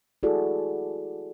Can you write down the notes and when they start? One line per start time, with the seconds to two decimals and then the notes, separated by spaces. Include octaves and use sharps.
0.23 E4 F#4 G#4 A4 D5